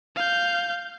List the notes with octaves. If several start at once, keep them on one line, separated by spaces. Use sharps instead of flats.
F5 G6